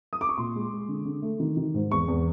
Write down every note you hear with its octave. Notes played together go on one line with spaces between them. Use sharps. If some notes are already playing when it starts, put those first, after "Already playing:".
D#6
D6
C#6
A#2 C6
G#3
G#3
D3
D3
A3
D#3
D#3
G#2
E2 C#6
E2